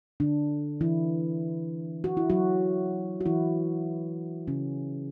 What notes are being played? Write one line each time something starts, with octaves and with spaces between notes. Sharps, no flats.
D3 D4
E3 E4
F#4
E4
F#3 F#4
F#4
E3 E4
C#3 C#4